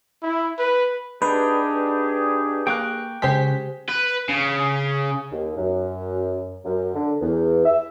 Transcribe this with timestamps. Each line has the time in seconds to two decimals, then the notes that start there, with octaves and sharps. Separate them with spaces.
0.23 E4
0.59 B4
1.22 G2 D4 D#4 G4 G#4 B4
2.67 A#3 G5 C#6 F#6
3.22 C#3 G#3 G4 C5 B6
3.89 B4
4.29 C#3
5.32 D#2
5.57 F#2
6.65 F#2
6.94 D3
7.21 E2
7.65 E5